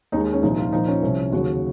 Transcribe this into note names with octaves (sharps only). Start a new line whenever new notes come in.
D#2 D#3 G#3 D#4
C#4
C2 A#2 F3 D#4
F4
A#2 F3 A#3 D#4
C#4
C2 C3 F3
D#2 C#3 F#3 F#4